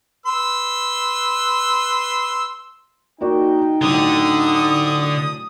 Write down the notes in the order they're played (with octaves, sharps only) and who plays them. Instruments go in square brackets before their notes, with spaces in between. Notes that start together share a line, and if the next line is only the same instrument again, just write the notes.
[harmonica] B4 C6 E6
[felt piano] A#3 F#4 D5 [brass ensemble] D#4 G5
[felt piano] A2 F#3 [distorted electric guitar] D3 [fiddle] D#6